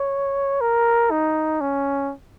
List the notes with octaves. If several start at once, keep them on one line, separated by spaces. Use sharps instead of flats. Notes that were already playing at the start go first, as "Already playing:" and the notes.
Already playing: C#5
A#4
D#4
C#4